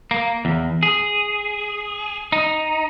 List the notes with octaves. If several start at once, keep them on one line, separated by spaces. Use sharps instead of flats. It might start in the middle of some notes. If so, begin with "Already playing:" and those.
A#3
E2
G#4
D#4